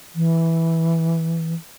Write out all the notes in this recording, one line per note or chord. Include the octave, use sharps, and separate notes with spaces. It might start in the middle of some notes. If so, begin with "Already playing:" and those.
E3